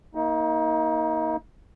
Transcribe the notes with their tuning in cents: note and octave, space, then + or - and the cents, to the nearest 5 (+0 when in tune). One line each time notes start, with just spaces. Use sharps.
A#3 +0 D#4 +30